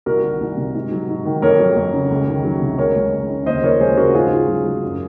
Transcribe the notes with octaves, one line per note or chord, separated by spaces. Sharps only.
C2 F#4 A#4
D#3
C2
C3
G#2
F#3
G#2
D#3
F2 A#4 C#5
F#3
F2
C#3
C#2
D#3
F#3
C3
C#2 A#4 C#5
G#3
C#2
C#3
D#2 C5 D#5
F3 A#4 C#5
G#3 G#4 C5
C#3 F#4 A#4
G#2 F4 G#4
G#2
F#3
F#3
F#2